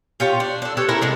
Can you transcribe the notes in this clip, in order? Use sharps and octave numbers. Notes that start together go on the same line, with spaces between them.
F4 G4 C#5 A5
D4
D4 A4
G4 A4 B4 C#5
C#4 E4 A4 A#4
C3 G#3 D4